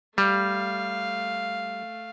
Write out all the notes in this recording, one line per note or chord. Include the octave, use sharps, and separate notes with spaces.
G3 A3 F5